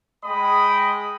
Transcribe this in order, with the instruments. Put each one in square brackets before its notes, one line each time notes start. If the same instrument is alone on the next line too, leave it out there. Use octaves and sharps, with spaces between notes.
[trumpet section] G#3 D#5 G5 B5 D#6